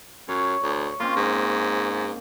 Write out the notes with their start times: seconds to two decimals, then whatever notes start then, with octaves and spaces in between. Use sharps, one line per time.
0.29 F#2 C#5
0.63 D2
1.00 A#3 C4 C#4 F4
1.16 G#2